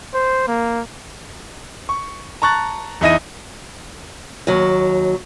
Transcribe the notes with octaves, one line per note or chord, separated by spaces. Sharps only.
C5
A#3
C#6
A5 A#5 C#6 F#6 A6
E2 D#4 E4 D#5 A#6 D#7
D#2 F#3